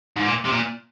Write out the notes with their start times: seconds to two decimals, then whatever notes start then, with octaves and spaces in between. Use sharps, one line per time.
0.17 G#2
0.25 A#2
0.45 C3
0.52 A#2